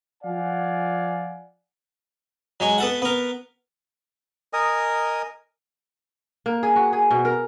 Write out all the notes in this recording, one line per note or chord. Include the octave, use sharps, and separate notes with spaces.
F3 D5 F5 F#5 G#5
F#3 G#3 C#6
B3 A4 F#5
B3 A#4
A#4 D#5 G#5 D#6
A#3
G#4
F#4
G#4
B2
A#4